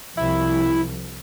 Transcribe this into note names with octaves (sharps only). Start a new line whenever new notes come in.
C2 F3 E4